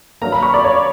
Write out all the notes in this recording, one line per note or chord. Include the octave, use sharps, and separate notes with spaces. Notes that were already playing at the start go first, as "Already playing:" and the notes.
G2 F#3 A#3 A#5
B5
C#6
D5
C#5